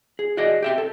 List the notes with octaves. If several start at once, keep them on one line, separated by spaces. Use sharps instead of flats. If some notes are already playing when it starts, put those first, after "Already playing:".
G#4
F#4 G#4 D5 D#5
G4 E5 G5
A4